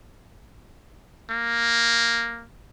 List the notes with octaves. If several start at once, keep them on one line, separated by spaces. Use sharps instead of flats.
A#3